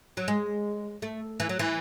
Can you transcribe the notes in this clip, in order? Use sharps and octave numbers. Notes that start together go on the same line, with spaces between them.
F#3
G#3
A3
E3
F#3
E3